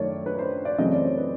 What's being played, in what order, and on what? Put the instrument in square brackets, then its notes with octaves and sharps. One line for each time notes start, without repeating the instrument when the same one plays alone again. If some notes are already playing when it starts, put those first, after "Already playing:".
Already playing: [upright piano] F#2 D#3 F#3 A3 C#5 D5
B4
C5
D5
F#2 C#3 E3 A3 C4 D#5
D5
C5
C#5
B4